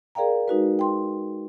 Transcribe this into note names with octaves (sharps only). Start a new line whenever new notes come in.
G#4 A#4 D5 F5 G5 A#5
G#3 D#4 F#4 B4
G5 C6